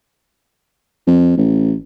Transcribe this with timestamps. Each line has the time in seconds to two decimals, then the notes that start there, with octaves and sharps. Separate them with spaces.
1.07 F2
1.37 A1